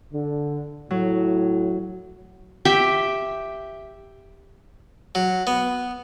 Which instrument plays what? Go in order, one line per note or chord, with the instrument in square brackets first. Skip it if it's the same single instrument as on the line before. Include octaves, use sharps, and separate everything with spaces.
[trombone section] D3
[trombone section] A2 [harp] F#3
[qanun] G4 E5 G5
[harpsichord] F#3
B3